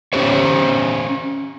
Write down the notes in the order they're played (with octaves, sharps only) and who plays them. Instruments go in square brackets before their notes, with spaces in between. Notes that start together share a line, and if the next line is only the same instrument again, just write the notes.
[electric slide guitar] C#4 E4 G4 C5 C#5